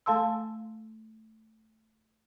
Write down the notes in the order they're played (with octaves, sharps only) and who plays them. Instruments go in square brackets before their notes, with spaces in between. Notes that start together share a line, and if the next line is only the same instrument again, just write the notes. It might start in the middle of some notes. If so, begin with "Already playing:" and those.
[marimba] A3 A4 F5 A5 C6 E6